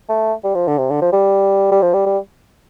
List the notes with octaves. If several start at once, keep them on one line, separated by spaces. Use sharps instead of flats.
A3
G3
F3
D3
C3
D3
F3
G3
G3
F3
G3
G3